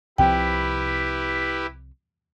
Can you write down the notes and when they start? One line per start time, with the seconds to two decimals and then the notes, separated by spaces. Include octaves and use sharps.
0.18 C2 C3 F3 E4 G4 B4 G5